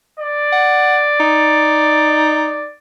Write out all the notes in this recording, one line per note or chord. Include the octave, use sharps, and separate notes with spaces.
D5
F#5
D#4